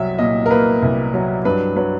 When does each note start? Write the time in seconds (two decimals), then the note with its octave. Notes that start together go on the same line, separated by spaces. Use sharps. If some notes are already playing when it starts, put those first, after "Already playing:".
Already playing: C2 F#3 E5
0.19 A#2 D#5
0.46 A#4
0.51 A#3 B4
0.82 C2
1.14 F#3
1.45 G2 B4
1.76 F#3 B4